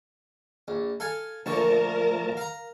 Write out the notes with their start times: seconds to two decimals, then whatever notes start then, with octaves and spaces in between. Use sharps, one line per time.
0.68 A#1
1.00 A4 F5 G#5
1.46 A#2 D3 F3 A3 A#4 A5 C#6
2.37 F5 A#5